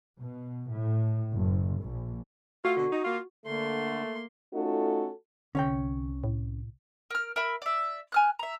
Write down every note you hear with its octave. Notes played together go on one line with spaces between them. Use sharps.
B2
A2
F#1
A#1
A3 F4 F#4
B2 D3
D#4
A#3 F4
D3 A3 A#3 C6
A3 C#4 D#4 F4 F#4 A4
C2 D3 C#4 C#5 G5
A2
A#4 F6
A#4 E5 B5
D5 E5
G#5 F6 F#6
E5 A#5